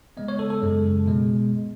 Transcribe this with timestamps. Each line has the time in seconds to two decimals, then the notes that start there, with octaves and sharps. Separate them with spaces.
0.17 C#3 G#3 B3 D#5
0.28 C#5
0.39 A4
0.50 A4
0.62 F#2 C#3 G#3
1.06 B2 G#3